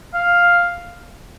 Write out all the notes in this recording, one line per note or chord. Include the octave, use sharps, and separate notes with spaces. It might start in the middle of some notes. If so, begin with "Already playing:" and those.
F5